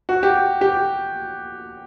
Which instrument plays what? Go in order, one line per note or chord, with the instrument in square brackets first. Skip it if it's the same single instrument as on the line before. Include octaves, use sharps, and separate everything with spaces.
[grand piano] F#4
G4
G4